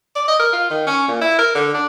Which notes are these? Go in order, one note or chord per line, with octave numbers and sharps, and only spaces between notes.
D5
D#5
A#4
F4
D#3
C#4
A#2
E4
A#4
D3
D4